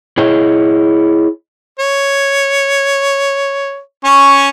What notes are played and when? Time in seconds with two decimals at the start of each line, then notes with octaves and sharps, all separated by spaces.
0.18 E4 G#4 C#5 D#5
1.79 C#5
4.05 C#4 C#6